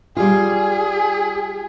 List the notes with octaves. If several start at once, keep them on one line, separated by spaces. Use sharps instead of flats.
G3 F4 G#4